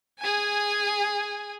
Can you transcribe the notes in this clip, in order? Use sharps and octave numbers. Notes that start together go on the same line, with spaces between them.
G#4 G#5